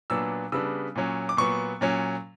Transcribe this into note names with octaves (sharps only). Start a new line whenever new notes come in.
A#2 F#3 B3 D4 E6
C#3 G3 B3 D4 E6
A#2 F#3 C#4
D6
A#2 F#3 B3 C#6
A#2 F#3 C#4